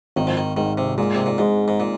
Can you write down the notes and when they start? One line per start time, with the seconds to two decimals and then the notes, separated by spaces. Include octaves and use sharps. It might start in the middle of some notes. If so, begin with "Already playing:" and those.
0.16 G#1 D#3
0.27 F3
0.37 D#3
0.57 G#2 D#3
0.78 C3
0.98 A#2 G#3
1.15 C3
1.26 A#2
1.38 G#2 G#3
1.68 G#2
1.80 A#2